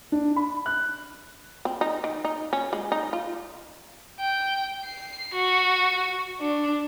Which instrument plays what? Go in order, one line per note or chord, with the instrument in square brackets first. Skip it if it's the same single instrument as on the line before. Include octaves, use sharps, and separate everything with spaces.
[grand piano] D4
B5
F#6
[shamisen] C4
D#4
D#3
D#4
C#4
G#3
D#4
F4
[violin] G5
C7
F#4
D4